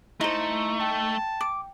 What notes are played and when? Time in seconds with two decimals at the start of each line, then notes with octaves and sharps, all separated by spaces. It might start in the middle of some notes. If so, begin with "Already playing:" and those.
0.21 A3 D#4 E4 C5 A#5 C#7
0.81 G5 A5
1.41 D6